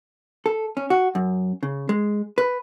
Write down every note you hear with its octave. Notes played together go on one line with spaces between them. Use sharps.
A4
C#4
F#4
F#2
C#3
G#3
B4